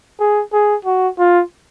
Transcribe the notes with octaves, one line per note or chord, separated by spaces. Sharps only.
G#4
G#4
F#4
F4